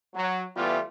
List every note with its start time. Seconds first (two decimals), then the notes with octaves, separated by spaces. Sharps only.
0.14 F#3
0.56 E3 G3 A3 B3 F4